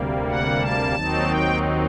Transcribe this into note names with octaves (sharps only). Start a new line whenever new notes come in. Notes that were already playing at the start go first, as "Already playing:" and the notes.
Already playing: D2 C3 G3 A#3
F#5
A5
D#2 D#3 F#3 C4 D#4
G5